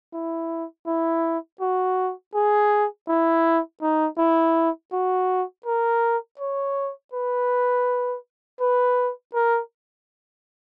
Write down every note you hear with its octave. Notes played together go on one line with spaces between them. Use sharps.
E4
E4
F#4
G#4
E4
D#4
E4
F#4
A#4
C#5
B4
B4
A#4